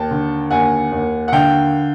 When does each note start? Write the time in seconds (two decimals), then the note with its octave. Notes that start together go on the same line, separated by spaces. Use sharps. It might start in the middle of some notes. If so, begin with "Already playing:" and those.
Already playing: D#2 G5 A5
0.11 D3
0.51 D#2 F#5 G#5
0.91 D#2
1.28 F#5
1.32 D3 F5 G5